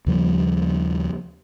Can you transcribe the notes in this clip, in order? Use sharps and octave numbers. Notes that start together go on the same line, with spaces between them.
D#2 C#3 F3 G3